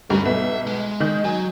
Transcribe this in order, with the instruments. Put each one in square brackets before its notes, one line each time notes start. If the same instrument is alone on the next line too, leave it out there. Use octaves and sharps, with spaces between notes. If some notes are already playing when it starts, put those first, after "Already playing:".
[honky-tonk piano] D2 G2 G3 [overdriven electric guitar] C#4 A#4
[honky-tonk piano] B1 B3 [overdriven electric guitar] E5
[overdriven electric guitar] G#3
[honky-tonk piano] D#3 G6
[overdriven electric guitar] F#3 [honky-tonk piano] G#5